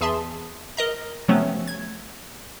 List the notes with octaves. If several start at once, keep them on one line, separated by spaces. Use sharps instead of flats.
E2 G#4 E5 A5 C6
A#4 D#5 A#5
C3 F3 F#3 A3 B3 C#4
G#6